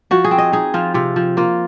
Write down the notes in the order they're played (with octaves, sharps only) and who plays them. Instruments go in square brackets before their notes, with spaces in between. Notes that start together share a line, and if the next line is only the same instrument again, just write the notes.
[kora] F3 F#4
G#4
C4
D#5
D#4 G#4
F3 F4
C3 F4
F3
A#3 F4